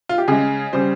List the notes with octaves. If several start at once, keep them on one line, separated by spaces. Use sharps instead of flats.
F4
G4
C#3 G#3 G#4
C#3 G3 C5